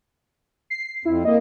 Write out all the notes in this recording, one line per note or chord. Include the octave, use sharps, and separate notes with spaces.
C7
F2 E4
A#3 D#5